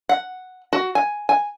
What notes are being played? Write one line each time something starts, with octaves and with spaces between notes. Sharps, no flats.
F#5
F#4
G#5
G#5